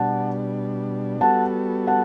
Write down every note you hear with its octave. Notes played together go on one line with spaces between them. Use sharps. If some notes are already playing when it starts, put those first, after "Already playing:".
Already playing: B2 G3 D4 F#5 A5
G3 B3 F#4 A4 F#5 A5
F#5 A5